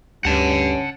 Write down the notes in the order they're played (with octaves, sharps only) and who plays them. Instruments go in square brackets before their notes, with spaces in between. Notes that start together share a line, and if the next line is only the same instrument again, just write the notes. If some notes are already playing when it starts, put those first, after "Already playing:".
[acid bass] D2 [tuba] G2 [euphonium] C#4 [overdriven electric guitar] F#5 A5